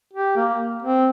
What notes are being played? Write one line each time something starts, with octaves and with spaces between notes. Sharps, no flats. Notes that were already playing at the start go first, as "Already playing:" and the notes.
G4
A#3
C4